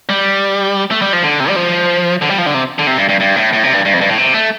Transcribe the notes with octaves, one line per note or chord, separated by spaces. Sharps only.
G3
A3
G3
F3
D3
C3
G3
F3
D3
G3
F3
D3
C3
D3
C3
G2
G2
G2
A2
A2
C3
G2
G2
F2
G2
A2
C3
A3